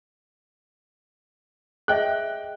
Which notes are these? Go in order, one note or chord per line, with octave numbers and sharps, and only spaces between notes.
G#4 D#5 E5 G5 F#6